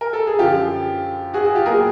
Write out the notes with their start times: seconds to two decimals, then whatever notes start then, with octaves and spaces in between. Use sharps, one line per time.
0.01 A#4
0.13 A4
0.27 G#4
0.39 F#2 D3 F3 F4 G4
1.34 F#4 G#4
1.45 F#4 G#4
1.55 F4 G4
1.66 A#2 F#3 B3 G#4 A#4